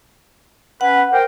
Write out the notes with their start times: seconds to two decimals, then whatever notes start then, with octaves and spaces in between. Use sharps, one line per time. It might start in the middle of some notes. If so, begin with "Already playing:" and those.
0.81 C#4 B4 F#5
1.12 A#4 C5 G5